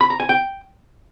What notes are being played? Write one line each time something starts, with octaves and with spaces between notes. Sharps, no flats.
B5
A#5
G#5
G5